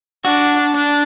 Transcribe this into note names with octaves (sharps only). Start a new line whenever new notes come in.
D4 F#4
D4